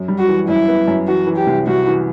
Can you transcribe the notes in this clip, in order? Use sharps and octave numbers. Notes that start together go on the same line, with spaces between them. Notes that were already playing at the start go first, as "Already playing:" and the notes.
Already playing: F#2
G3
F#4
E3
F#2 E4
B3
F#2
E3 F#4
E3
G4
C2
C2 F#4
E3